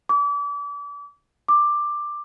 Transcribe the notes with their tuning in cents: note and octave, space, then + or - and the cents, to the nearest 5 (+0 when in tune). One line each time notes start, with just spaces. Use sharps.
D6 -35
D6 +10